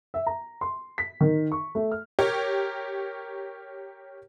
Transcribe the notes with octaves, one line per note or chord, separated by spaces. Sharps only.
E5
A#5
C6
B6
D#3
C#6
A3
F6
G4 A#4 C#5